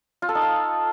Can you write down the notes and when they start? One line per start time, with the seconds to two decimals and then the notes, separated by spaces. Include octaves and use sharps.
0.22 F4
0.29 A4
0.35 D#4
0.42 F5